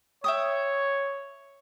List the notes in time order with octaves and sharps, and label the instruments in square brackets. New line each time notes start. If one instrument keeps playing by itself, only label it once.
[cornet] C#5 [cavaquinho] E5 G5 D#6